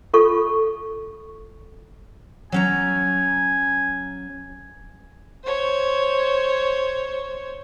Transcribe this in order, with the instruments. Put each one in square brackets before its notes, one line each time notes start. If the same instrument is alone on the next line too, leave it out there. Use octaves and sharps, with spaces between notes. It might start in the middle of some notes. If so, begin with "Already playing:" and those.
[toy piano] F4 A4 C#6
[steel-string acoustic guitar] F#3 C#4 A#5 [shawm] G#5
[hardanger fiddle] C5 C#5